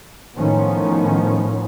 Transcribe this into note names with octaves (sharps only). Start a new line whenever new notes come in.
A2 D#3 F3 B3 C#4